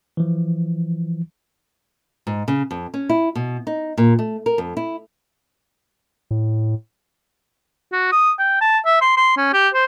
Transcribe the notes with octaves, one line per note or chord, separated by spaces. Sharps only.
E3 F3
G#2
C#3
F2
C#4
E4
B2
D#4
A#2
A3
A#4
F2
E4
A2
F#4
D#6
G5
A5
E5
C6
C6
C#4
G4
C5